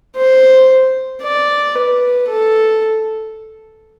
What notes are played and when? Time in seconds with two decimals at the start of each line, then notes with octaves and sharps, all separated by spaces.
0.16 C5
1.23 D5
1.75 B4
2.28 A4